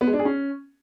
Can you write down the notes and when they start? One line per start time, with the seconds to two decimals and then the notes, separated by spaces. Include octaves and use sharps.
0.01 B3
0.07 G#3
0.13 D4
0.19 G#4
0.25 C#4